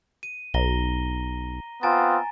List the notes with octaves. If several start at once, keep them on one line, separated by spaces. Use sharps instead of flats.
D#7
B1 A#5 A#6 G7
B3 C4 F4 G#5 A#5 A6